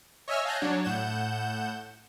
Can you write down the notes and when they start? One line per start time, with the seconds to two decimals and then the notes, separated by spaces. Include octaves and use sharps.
0.28 C#5 D#5 E5 G#5 E6 F6
0.45 F5 G#5 A5 F#6 G6 A#6
0.61 F#3 D4 C#5
0.84 A2 F#5 G6 E7